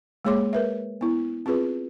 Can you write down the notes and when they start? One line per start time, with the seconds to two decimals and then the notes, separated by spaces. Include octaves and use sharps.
0.25 G#3 A#3 G#4 C#5 C6 D6
0.53 A#4 B4 E5
1.01 B3 E4
1.46 C4 F4 G#4 B4